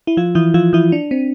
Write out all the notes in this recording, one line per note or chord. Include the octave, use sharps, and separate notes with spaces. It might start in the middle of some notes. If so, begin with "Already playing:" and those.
E4
F3 F4
E3 E4
F3 F4
E3 E4
D4
C4